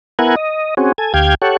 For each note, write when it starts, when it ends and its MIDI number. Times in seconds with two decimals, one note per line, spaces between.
0.19 0.36 59
0.19 0.36 64
0.19 0.36 70
0.19 0.36 78
0.19 0.36 80
0.36 0.74 75
0.77 0.92 60
0.77 0.92 61
0.77 0.92 66
0.77 0.92 68
0.98 1.13 69
0.98 1.13 80
1.14 1.35 38
1.14 1.35 67
1.14 1.35 77
1.14 1.35 79
1.14 1.35 92
1.42 1.57 67
1.42 1.57 69
1.42 1.57 73
1.42 1.57 78